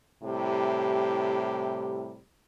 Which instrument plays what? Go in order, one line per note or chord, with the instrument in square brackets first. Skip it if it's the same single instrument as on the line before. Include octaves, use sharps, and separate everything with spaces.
[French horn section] A2 C3 G3 E4 G4